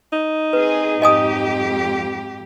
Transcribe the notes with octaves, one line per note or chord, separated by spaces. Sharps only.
D#4
C4 G#4 B4
F2 G#2 G4 D#5 G#5 D#6